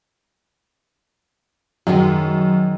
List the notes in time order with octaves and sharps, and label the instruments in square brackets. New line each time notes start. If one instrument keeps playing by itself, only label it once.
[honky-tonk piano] F#2 [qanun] D#3 F#3 G#3